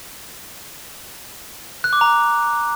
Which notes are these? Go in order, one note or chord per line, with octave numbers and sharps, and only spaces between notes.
F#6
D6
A#5